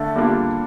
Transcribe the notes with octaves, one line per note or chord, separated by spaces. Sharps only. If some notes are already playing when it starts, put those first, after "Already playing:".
Already playing: D3 A3
G3 A#3 D4 F4